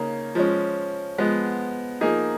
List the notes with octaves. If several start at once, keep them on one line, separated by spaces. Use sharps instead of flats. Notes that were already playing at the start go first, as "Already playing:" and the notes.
Already playing: C#3 A#3 D#4
F3 G#3 C#4
F3 G#3 B3
F3 A#3 D#4 G#4